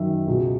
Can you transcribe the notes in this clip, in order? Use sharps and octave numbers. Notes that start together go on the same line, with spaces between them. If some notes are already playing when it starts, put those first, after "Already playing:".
Already playing: F#2 D#3 E5
C#2 B2